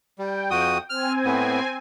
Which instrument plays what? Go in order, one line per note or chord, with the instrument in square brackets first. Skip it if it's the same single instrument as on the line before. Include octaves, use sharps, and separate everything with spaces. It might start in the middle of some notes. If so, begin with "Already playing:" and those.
[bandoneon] G3 [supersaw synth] G5
[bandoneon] F2 F#4 D#6
[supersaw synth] C4 G#5 [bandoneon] F6
[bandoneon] A2 B3